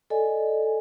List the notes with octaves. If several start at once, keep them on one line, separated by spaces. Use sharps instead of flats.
A4 D5 D#5 G#5